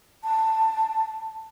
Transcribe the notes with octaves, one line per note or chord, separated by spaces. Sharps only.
A5